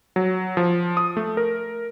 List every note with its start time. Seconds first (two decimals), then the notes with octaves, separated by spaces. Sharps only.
0.16 F#3
0.57 F3
0.97 D#6
1.17 A3
1.37 A#4